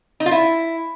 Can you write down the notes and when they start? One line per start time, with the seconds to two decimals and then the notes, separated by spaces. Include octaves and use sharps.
0.20 D#4
0.26 F4
0.31 E4